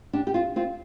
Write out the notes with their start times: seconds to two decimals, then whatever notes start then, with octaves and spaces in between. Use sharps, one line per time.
0.13 D4 G4
0.27 G4
0.34 C4 F4
0.56 C4 F4